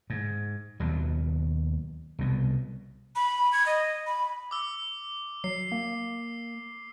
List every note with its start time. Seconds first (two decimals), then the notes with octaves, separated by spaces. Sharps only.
0.10 G#2
0.80 D#2 B2 F#3
2.19 C2 B2
3.16 B5
3.52 G#6
3.66 D#5
4.07 B5
4.51 D6 E6
5.44 F#3 C7
5.72 A#3